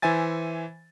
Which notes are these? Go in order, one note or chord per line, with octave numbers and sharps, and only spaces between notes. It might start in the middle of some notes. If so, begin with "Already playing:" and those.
E3 C5 E5 G#5 A6